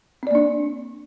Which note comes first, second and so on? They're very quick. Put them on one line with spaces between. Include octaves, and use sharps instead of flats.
C4 D5 A#3 D4